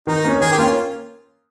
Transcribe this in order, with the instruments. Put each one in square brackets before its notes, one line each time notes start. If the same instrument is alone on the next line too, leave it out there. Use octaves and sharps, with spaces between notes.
[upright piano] D#3 [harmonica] D#4
[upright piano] A#3 C#4
[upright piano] D#3 [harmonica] G#4
[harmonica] G4
[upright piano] A#3 C#4 [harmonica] F4